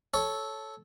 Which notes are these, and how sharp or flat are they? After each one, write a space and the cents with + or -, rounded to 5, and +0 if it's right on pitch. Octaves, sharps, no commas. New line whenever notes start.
A4 -10 C#5 +0